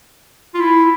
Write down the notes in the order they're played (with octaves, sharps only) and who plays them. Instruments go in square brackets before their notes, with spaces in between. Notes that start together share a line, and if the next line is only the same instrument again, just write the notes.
[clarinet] F4
E4